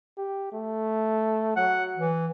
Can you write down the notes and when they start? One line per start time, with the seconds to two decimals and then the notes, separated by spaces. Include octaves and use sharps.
0.18 G4
0.52 A3
1.56 F#3 F#5
1.97 E3